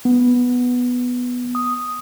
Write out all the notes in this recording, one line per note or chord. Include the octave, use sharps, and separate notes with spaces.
B3
D#6